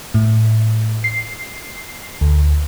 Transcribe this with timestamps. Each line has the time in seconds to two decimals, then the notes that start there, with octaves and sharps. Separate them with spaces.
0.14 A2
1.04 C7
2.21 D2